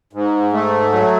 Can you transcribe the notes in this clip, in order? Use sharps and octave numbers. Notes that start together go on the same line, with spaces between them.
G#2
A3
F#3